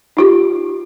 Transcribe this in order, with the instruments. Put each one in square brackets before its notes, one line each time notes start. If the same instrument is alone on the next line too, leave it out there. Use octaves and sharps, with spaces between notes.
[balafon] D#4 F4 G4